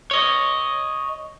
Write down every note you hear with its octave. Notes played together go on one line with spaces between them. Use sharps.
C#5 D#5